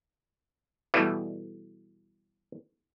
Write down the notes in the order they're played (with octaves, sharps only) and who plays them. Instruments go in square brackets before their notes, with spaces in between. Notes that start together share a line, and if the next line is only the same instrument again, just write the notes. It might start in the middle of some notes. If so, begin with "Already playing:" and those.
[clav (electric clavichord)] B2 E3 G3 A3